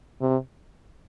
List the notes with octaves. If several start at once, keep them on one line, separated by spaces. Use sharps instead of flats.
C3